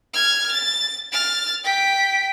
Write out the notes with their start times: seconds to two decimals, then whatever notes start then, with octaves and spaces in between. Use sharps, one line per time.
0.14 F6 G#6
0.51 A6
1.12 F6 A6
1.64 G5 B6